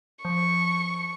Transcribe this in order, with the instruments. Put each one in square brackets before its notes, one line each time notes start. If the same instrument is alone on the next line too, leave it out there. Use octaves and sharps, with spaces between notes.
[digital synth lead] F3 [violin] C#6